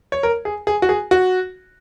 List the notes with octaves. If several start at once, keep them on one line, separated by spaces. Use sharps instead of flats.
C#5
A#4
G#4
G#4
F#4
G#4
F#4